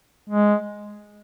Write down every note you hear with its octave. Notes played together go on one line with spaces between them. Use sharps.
G#3